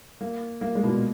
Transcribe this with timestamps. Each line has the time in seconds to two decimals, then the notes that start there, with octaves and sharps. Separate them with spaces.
0.21 A#3
0.61 A#3
0.75 G#3
0.83 B2
0.88 A#2